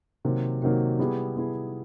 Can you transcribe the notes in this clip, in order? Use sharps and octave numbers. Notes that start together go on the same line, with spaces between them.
C3 D#3 F#3 A#3
C3 D#3 F#3 A#3
G3 B3 E4 G#4
G3 B3 E4 G#4